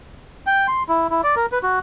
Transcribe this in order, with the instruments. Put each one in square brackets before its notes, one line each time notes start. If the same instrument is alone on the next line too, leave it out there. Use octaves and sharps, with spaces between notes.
[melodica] G5
C6
E4
E4
D5
A#4
B4
F#4